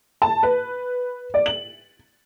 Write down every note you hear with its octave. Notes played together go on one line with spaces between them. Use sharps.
A5
B4
D5
F#7